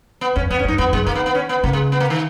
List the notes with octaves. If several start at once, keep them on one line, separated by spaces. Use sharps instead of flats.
B3
F2 C#4
F2 B3
C#4
F#2 D#4
F2 B3
F#2 G#3
D#3 A#3
B3
B3
C#4
B3
C#3 A#3
G#3
B3
A#3
D#3